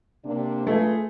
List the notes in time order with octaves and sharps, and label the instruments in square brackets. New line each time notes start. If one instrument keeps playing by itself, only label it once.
[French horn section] C3 A#3 D4
[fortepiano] A3 [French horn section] F4 G#4 B4